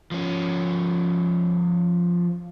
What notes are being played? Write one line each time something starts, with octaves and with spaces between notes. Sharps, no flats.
F3 C#4